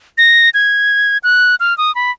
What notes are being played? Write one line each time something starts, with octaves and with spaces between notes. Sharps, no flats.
A#6
G#6
F#6
F6
D#6
B5